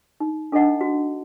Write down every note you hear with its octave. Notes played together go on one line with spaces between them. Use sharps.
D#4
D4 A4 C5 D#5 F#5 A5
F#4